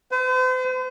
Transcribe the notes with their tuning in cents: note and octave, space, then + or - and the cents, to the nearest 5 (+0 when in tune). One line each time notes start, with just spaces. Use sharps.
C5 -45